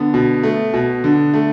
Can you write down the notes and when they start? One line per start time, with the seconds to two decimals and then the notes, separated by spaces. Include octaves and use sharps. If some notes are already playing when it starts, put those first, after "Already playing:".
Already playing: D3 B3
0.14 B2
0.43 A3
0.74 B2
1.04 D3
1.34 A3